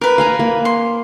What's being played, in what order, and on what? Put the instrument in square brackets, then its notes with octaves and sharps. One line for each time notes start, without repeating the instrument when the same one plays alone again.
[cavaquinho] A#4 B4 [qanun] D6
[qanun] F5 G#5 A#5
A#3
[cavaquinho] C6